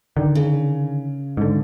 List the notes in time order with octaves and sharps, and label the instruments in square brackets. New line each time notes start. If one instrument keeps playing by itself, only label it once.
[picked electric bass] D3 D#3
[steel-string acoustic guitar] C#3
[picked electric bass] G#2 D3